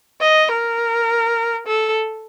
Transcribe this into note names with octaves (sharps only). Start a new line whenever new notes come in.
D#5
A#4
A4